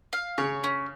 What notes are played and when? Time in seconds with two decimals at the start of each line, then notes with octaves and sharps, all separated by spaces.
0.13 F5
0.38 C#3 C#5
0.64 C#4